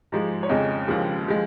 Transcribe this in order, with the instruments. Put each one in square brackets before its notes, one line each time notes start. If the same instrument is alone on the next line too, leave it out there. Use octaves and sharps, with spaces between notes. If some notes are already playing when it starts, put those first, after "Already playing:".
[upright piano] G#2 F3 G#3
C#5
F2 C#3 G#3 D#5
D#2 C#3 F3 G#3
F3 G#3